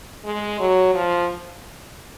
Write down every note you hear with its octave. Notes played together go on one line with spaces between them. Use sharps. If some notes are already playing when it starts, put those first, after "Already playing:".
G#3
F#3
F3